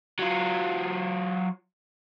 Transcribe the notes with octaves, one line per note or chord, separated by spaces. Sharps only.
F#3 F4